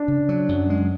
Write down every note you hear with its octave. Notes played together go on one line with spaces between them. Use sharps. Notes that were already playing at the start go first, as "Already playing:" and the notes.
Already playing: D4
C#3
F#3
F#2
G#3